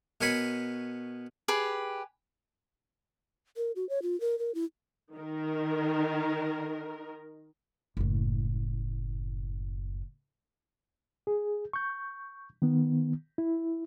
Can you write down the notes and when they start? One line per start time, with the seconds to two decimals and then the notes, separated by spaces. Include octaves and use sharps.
0.21 B2 A#4 C#5 G#5 B5 C#6
1.48 G4 G#4 B4
3.57 A#4
3.76 F#4
3.89 C#5
4.02 F4
4.21 A#4
4.39 A#4
4.55 E4
5.14 D#3 A#4
7.97 F#1 A2
11.27 G#4
11.73 C#6 G6
12.62 D#3 B3
13.38 E4